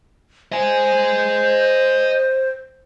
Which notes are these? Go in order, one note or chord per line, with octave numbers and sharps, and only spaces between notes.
C5 D#5 G#5